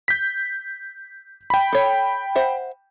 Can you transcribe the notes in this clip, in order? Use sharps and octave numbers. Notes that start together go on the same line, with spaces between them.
G6 B6
G5 B5
A4 C#5
C5 E5 F#5